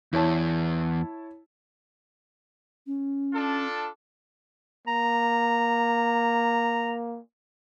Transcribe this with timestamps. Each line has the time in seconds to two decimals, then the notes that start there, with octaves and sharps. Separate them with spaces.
0.13 E2 E4 C#5 A5
2.87 C#4
3.33 D4 F4 A4
4.87 A#3 A#5